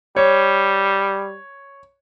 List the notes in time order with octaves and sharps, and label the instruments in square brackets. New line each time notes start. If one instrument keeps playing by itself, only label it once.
[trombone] G3 [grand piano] C#5